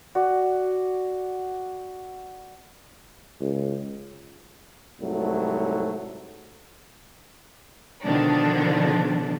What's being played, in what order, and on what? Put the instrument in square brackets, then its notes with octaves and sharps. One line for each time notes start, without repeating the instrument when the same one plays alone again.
[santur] F#4 D5
[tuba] C#2
[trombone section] C2 G#2 F#3 A3
[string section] B2 D3 D#3 F3 D4